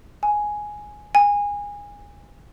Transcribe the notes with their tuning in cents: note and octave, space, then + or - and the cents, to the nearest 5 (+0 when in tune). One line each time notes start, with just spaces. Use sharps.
G#5 +5
G#5 -25